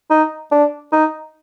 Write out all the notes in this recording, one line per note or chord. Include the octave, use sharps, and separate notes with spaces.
D#4
D4
D#4